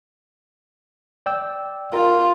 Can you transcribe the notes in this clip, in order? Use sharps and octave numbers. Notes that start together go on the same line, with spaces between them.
D5 G5 E6
F4 A#4